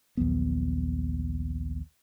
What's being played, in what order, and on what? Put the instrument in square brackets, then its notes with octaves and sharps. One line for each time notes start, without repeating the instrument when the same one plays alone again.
[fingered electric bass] A#1 D#2 F#3 B3